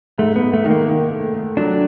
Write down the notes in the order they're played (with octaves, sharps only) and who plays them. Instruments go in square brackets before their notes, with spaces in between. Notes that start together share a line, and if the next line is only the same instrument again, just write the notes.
[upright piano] G#2 [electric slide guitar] A3
[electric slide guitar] B3
[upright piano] G#2
[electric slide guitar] A3
[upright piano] D#3
[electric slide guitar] A#3
[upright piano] D#3
A3
A3
[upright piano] F#3 [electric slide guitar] D4